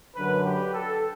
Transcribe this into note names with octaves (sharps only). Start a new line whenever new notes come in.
F#2 D3 F#3 B4
G4
A4